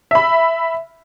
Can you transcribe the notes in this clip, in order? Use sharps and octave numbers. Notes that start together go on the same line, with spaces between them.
E5 B5